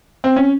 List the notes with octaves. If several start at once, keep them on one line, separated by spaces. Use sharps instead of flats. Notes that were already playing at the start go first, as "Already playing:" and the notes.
C4
C#4